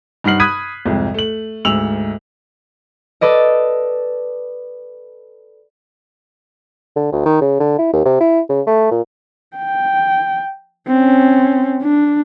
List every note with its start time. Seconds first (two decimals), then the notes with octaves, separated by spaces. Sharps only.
0.24 G2 D#4 F#5 F6 C7 F#7
0.40 B5 D#6 F#6 G#6 B6 D#7
0.86 C2 F2 G#2
1.14 A3 F#7
1.65 D2 G#2 E6 F7 F#7
3.21 A4 B4 D5 D#5
6.96 D3
7.12 D2
7.26 D#3
7.41 C#3
7.60 D3
7.78 E4
7.93 D#2
8.05 C3
8.20 E4
8.49 C#3
8.67 A3
8.91 A#2
9.57 G5
10.88 C4 C#4
11.82 D4